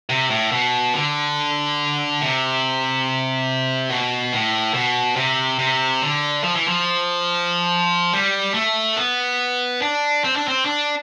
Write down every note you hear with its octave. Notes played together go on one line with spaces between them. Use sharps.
C3
A2
B2
D3
C3
B2
A2
B2
C3
C3
D3
F3
E3
F3
G3
A3
B3
D4
C4
D4
C4
D4